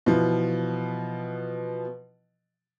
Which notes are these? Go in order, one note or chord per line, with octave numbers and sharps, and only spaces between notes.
B2 E3 F3